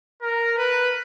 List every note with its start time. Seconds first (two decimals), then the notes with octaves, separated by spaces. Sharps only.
0.22 A#4
0.57 B4